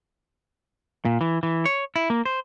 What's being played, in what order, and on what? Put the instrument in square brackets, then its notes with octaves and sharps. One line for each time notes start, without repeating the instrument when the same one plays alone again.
[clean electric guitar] A#2
E3
E3
C#5
E4
A#3
C5